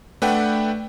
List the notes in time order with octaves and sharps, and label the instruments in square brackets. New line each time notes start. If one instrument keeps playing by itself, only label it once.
[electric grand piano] A3 D4 B4 F#5 G5